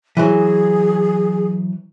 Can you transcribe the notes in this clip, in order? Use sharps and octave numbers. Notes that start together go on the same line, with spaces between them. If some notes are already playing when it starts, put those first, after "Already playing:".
E3 F#3 G#4